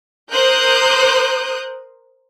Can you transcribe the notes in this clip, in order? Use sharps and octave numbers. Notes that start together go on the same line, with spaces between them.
A#4 C5 D#6 F#6 G6